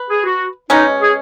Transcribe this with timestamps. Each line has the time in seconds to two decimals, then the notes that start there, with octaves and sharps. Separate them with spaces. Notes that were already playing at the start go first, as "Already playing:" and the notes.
Already playing: B4
0.09 G#4
0.24 F#4
0.70 B2 G#3 C#4 D#4
1.01 G#4